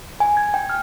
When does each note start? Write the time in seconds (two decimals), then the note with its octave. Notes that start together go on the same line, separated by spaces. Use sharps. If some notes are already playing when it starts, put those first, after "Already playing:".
0.20 G#5
0.37 G#6
0.54 G5
0.70 F6